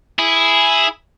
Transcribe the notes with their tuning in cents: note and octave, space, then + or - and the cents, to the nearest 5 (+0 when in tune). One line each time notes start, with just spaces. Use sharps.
E4 +0 G#4 +0